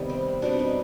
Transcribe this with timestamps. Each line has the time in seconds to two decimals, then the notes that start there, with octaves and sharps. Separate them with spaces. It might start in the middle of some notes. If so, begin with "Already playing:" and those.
Already playing: C3 D#3 G3 B3
0.10 C4
0.42 B2 G3 C4 D4
0.59 D#4